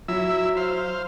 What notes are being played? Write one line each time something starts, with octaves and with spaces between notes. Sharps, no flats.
F#3 E4 E5
C5 F5